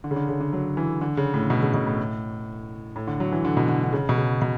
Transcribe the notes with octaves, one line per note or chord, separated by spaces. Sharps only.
D3
C#3
D3
C#3
D3
F#3
E3
D3
C#3
A2
B2
C#3
B2
A2
A2
D3
F#3
E3
D3
B2
D3
D3
C#3
B2
C#3
B2